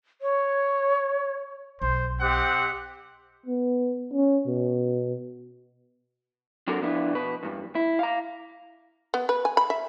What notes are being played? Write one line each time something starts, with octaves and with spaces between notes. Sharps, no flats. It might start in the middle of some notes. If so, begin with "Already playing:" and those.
C#5
B1 C5
C4 G4 C5 D#5 F#5 D6 F#6
B3
C#4
B2
F#3 C4 D4 F#4 A4 A#4
F3 B3 D4 E4
B2 B4
E2 G2
E4
F5 A#5
B3
B4
G#5
B5
E5